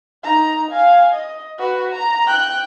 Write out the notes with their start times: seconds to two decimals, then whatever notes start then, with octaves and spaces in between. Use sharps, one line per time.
0.24 D#4 A#5
0.71 F5 G#5
1.13 D#5
1.59 F#4 B4
1.92 A#5
2.27 G5 F#6